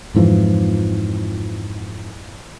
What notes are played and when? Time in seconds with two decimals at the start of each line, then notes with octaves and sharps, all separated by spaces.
0.15 F2 G#2 E3 F3